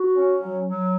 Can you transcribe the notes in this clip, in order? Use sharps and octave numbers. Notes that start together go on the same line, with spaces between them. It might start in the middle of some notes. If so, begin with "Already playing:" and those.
Already playing: F#4
C#4
F#3
F#3